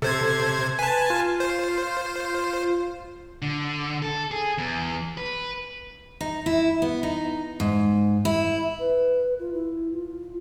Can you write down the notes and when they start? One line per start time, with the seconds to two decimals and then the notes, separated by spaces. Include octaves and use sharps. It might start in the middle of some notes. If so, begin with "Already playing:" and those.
0.02 C3 A4 C5 G#6
0.79 B4 G#5 A5
1.10 F4
1.40 C5
3.42 D3
4.02 A4
4.31 G#4
4.58 E2
5.17 B4
6.21 D#4
6.46 E4
6.82 B3
7.03 D#4
7.60 G#2
8.25 E4
8.79 B4
9.39 F4
9.54 E4
9.93 F4